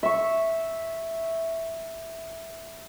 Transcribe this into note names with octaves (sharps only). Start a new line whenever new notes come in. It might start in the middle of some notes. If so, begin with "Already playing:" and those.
E5 C#6